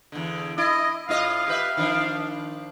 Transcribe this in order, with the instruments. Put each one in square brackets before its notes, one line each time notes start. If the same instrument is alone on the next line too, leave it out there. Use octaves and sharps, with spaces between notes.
[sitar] E2 D3
[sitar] E4 [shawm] D#5
[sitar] A2 F4 D#5 [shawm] F5
[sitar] G4 B4 E5
D#3 F3 D4